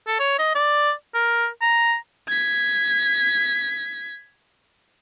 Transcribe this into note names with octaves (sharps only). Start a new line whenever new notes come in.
A4
C#5
D#5
D5
A#4
A#5
G#6 B6